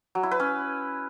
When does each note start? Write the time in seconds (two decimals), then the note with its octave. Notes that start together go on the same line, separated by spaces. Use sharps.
0.15 F#3
0.23 E4
0.31 B4
0.40 C#4